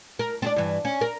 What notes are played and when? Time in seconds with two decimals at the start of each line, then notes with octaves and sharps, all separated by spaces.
0.19 A#4
0.42 C4 D4 D5
0.56 G2 E3
0.85 C#4
1.01 A#4